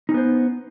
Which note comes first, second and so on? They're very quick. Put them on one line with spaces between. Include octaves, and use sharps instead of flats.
D#4 C#4 B3 C5